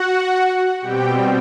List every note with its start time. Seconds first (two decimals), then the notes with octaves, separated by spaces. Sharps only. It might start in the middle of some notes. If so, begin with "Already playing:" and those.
Already playing: F#4 F#5
0.80 B2 G3 C4 G4 G5